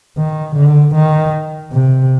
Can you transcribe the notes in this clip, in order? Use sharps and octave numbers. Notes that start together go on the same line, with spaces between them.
D#3
D3
D#3
C3